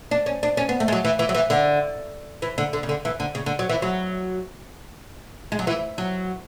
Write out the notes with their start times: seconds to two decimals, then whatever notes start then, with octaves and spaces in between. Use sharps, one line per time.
0.11 D4
0.26 C#4
0.43 D4
0.57 C#4
0.69 B3
0.80 A3
0.88 G#3
0.92 F#3
1.05 E3
1.19 E3
1.29 F#3
1.35 E3
1.50 D3
2.42 E3
2.58 D3
2.73 D3
2.83 C#3
2.89 D3
3.05 E3
3.20 D3
3.35 C#3
3.46 D3
3.59 F#3
3.69 E3
3.82 F#3
5.52 G#3
5.59 F#3
5.67 E3
5.98 F#3